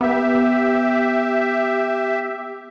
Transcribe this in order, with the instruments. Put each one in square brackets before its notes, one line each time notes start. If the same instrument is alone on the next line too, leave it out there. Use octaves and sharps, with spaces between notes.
[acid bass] B3 [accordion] G4 E5